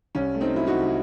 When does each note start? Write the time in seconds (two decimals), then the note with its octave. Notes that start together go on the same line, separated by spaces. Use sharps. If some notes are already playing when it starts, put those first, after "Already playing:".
0.15 C2 C#4
0.34 A3
0.40 C4 D#4
0.54 F#3 E4
0.67 D#4 F#4
0.74 C3
0.86 E4